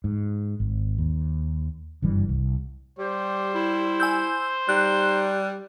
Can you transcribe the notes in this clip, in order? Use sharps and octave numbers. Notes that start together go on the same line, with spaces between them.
G#2
G#1
D#2
F#1 G2 E3 G3
C2
G3 G4 C5
E4
G#5 E6 G6
G3 D#4 F#6